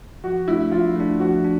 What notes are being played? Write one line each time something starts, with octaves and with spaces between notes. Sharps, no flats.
F3 F#4
A3 D4 E4
F3 F4
A3 D4
F3 F#4
D4